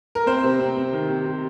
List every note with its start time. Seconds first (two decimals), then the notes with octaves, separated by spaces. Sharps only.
0.15 A#4
0.26 C4 C5
0.44 C3
0.60 C4
0.77 C4
0.93 D#3
1.10 C3
1.26 C3